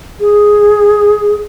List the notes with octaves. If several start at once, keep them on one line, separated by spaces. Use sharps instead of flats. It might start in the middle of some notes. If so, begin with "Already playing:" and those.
G#4